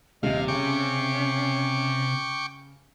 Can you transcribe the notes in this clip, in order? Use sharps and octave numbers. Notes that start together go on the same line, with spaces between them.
D#1 C3 D#5 F5 C7
C#3 C#4 G5 C#6 D6